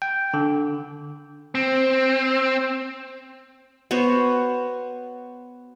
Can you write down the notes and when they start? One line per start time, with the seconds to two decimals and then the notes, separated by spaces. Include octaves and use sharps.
0.02 G5
0.34 D3
1.55 C4
3.91 B3 F#4 C5 C#5